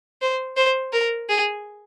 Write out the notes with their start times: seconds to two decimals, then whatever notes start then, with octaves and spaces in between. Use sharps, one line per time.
0.22 C5
0.57 C5
0.93 A#4
1.29 G#4